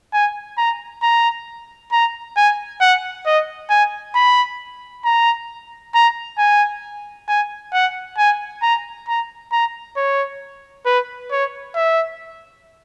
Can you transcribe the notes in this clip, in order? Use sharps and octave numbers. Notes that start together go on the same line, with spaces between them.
G#5
A#5
A#5
A#5
G#5
F#5
D#5
G#5
B5
A#5
A#5
G#5
G#5
F#5
G#5
A#5
A#5
A#5
C#5
B4
C#5
E5